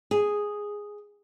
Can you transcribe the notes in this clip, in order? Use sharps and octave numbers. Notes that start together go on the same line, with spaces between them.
G#4